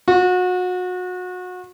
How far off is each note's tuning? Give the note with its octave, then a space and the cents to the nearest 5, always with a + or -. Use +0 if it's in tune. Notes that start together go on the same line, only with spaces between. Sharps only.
F#4 -30